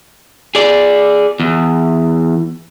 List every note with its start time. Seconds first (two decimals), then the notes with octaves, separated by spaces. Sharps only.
0.55 G#4 D5
1.40 E2